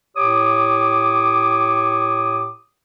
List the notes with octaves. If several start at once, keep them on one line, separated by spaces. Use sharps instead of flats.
A2 G4 C#5 D6 D#6